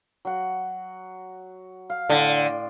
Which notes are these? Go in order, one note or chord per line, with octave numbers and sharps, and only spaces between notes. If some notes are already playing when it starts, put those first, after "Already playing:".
F#3 F#5
F5
A2 D3 G5 C6